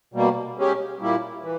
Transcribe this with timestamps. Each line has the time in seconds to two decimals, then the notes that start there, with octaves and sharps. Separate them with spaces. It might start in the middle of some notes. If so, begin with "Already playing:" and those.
0.14 B2 G3 A#3
0.57 G#3 C#4 G4
1.01 A#2 G3 A#3 E4 G4
1.43 E3